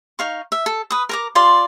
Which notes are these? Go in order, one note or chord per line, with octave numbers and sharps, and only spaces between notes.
D#4 F5 C#6
E5
A4
B4 D#6
A#4 A#5 D6
F4 D5 C6